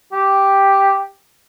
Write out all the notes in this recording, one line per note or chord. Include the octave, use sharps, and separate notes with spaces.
G4